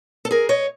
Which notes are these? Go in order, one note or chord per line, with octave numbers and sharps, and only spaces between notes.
A4
G#4 A#4
C#5 D#5